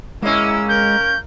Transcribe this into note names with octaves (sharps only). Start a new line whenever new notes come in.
G#3 A#3 C#4 E4 E6
A#4 G6